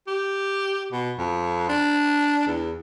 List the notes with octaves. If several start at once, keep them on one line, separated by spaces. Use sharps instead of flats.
G4
B2
F2
D4
E2